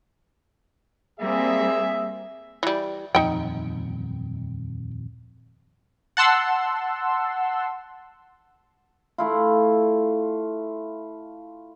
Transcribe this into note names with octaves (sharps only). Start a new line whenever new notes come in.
G3 A#3 C4 G#4 E5
E3 G3
D#1 F2 D#4 G5
F#5 A5 C6 E6
A3 E4 F4